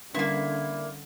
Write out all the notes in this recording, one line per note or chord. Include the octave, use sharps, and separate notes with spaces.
D3 G3 A#3 C#4 D4 E4